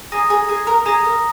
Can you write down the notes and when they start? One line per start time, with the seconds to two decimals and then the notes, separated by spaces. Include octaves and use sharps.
0.12 G#4 A#5 D#6 A#6
0.30 G#4
0.49 G#4
0.67 A#4
0.86 G#4 A#5 D#6 A#6
1.05 A#4